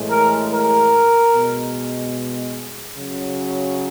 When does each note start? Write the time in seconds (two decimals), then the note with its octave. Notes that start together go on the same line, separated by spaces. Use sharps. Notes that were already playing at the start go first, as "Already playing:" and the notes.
Already playing: A2 E3 G#3
0.10 A#4
0.52 A#4
1.33 B2 G#3
2.97 C#3 F#3